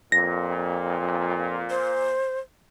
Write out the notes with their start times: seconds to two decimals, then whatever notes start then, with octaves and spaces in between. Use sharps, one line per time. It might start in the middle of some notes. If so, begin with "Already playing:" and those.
0.12 F2 A#2 A#6
1.70 C5